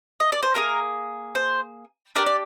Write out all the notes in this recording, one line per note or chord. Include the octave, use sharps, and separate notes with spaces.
D#5
D5
C5
A#3 F4 G#4 A#4
C5
D4 G4 A#4 D5
D5